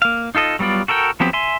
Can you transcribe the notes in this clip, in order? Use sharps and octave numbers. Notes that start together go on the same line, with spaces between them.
A#3 F5
D#4 F4 A4 D#5
F#3 G3 B3 F4 D5
F#4 A4 A#4 D#5 G5
F3 F#3 B3 C4 G4
E5 G#5 C6